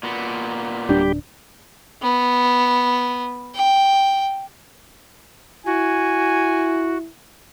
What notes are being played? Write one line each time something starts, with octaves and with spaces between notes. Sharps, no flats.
A#2 B3
D1 G3 D4 G4
B3
G5
E4 F#4 G#5